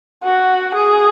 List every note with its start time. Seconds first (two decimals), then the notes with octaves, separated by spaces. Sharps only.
0.23 F#4
0.75 G#4